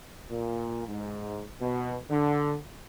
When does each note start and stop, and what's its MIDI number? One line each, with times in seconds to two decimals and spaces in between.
0.31 0.87 46
0.88 1.45 44
1.61 1.96 47
2.10 2.57 50